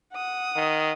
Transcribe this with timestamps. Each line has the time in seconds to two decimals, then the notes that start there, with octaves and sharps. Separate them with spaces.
0.13 F#5 D#6
0.57 D#3